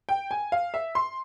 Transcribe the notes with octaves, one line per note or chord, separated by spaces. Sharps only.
G5
G#5
F5
E5
C6